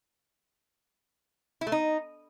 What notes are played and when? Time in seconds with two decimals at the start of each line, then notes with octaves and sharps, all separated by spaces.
1.61 E4
1.67 A3
1.72 D#4